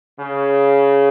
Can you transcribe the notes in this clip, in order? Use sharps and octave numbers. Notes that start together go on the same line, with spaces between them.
C#3